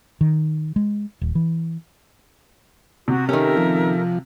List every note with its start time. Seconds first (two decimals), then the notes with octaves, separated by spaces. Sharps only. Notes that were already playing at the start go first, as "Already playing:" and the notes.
0.21 D#3
0.76 G#3
1.21 D#1
1.35 E3
3.08 C3 F#4 D#6
3.29 D#3 C#4 G4 A4 A#4 E5
3.57 F3